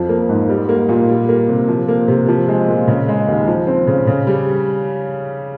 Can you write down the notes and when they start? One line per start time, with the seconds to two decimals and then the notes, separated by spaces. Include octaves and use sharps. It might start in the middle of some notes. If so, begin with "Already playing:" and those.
Already playing: F2 F3
0.09 A#3
0.29 G#2
0.49 G3
0.69 A#3
0.89 A#2
1.09 G3
1.29 A#3
1.49 C3
1.69 F3
1.88 A#3
2.08 C3
2.28 F3
2.48 G#3
2.68 A#2
2.88 C#3
3.08 G#3
3.28 D#2
3.47 F3
3.67 C4
3.87 C#3
4.07 C#3
4.27 G3